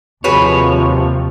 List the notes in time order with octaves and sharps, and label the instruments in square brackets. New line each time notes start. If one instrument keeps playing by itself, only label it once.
[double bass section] D#2 C3 F3 [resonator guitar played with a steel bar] F#4 G#4 B4 [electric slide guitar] C#5